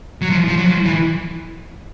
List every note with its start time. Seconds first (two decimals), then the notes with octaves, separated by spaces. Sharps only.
0.22 F#3
0.30 F3
0.48 F3
0.58 F#3
0.67 F3
0.86 E3